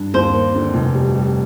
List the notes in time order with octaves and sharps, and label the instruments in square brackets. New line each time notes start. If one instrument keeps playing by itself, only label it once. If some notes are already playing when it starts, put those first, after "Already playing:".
Already playing: [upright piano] G2
[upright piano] D#2 [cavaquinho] C5
[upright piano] A#3
D3
F1
G3
G3